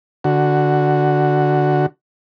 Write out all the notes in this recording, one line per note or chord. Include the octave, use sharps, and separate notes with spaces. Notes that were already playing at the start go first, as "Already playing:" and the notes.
D3 F#4